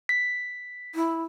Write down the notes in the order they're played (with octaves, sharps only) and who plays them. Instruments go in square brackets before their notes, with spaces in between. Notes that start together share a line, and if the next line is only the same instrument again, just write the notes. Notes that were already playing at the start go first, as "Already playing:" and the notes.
[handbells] B6
[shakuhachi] E4